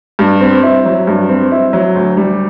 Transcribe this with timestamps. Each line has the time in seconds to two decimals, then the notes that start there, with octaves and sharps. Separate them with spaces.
0.19 G2
0.40 C4
0.63 E4
0.85 F#3
1.07 G2
1.29 C4
1.52 E4
1.73 F#3
1.95 D2
2.17 G3